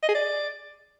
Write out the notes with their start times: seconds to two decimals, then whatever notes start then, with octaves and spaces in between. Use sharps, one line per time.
0.03 D#5
0.09 G#4
0.14 D5